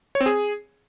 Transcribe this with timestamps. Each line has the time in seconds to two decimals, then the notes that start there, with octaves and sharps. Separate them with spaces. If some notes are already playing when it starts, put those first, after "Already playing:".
0.15 C#5
0.21 C4
0.26 G#4